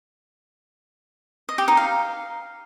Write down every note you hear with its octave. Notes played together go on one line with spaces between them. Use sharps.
D#5
G4
D#4
F5